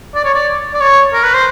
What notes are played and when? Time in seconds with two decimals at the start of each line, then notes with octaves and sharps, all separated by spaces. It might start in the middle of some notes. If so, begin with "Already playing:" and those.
0.15 D5
0.24 C#5
0.34 D5
0.74 D5
0.81 C#5
1.14 A#4
1.24 B4
1.34 C5